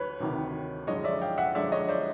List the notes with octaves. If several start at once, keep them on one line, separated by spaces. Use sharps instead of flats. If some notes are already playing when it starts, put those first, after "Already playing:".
Already playing: D2 B4 C#5
D2 C3 D#3
F#2 D3 F3 G#3 C#5 D#5
D5 E5
F5 G5
E5 F#5
F#2 D3 F3 G#3 D5 E5
C#5 D#5
C5 D5